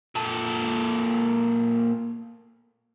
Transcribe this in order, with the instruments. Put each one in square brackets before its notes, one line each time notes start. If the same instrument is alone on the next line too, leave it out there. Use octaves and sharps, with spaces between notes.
[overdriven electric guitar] A#2 A4